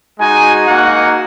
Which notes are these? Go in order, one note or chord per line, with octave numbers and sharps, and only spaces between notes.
G#3 D#4 F#4 G#5
A#3 D#4 F#4 F#5